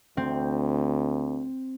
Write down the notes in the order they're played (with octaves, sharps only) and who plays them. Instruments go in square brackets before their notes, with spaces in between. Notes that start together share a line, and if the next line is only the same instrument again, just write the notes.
[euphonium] D2 [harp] C4